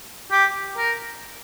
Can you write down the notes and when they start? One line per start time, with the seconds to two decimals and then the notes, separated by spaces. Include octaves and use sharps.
0.31 G4
0.77 A#4